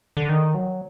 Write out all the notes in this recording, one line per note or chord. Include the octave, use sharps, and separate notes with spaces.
D3
D#3
F#3